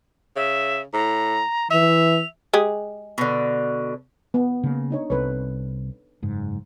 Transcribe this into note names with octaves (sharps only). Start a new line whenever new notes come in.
C#3 E5
A2 A#5
E3 E5 F7
G#3 G4 G#4
B2 D3
B3
C#3 A#3
D4 D#4 C#5
C2 G#3 C4 A4 B4 C#5
F#1 G#2